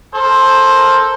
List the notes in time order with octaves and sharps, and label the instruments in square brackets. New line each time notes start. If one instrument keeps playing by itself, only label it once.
[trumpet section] A4 A#4 C5